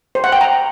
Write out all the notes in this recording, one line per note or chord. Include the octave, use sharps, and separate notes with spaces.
C5
F#5
G5
A#5